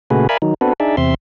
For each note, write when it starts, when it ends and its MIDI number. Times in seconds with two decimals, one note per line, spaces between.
0.10 0.27 46
0.10 0.27 49
0.10 0.27 57
0.10 0.27 66
0.10 0.27 68
0.10 0.27 71
0.29 0.37 70
0.29 0.37 74
0.29 0.37 76
0.29 0.37 77
0.29 0.37 80
0.29 0.37 83
0.42 0.54 51
0.42 0.54 54
0.42 0.54 63
0.61 0.73 59
0.61 0.73 60
0.61 0.73 62
0.61 0.73 66
0.61 0.73 69
0.61 0.73 71
0.80 0.96 62
0.80 0.96 63
0.80 0.96 68
0.80 0.96 74
0.80 0.96 76
0.97 1.14 40
0.97 1.14 48
0.97 1.14 60
0.97 1.14 76
0.97 1.14 84